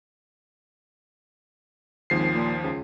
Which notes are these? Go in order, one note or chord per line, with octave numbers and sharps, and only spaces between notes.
G#1 D#2 F3 C7
A#2
C#2